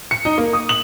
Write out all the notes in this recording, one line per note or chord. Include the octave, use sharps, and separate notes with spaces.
C#7
D#4
A#3
D#6
F#7